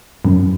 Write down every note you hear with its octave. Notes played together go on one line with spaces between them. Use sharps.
F#2